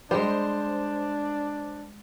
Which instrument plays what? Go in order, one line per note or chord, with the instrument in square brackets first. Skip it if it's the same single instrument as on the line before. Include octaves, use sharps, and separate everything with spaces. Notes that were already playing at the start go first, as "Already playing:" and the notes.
[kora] G3 G#3 [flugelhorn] D4 [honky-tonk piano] C5